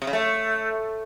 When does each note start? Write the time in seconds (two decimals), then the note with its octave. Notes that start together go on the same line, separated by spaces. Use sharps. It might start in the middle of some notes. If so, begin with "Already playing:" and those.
0.02 C3
0.07 C#3
0.13 A3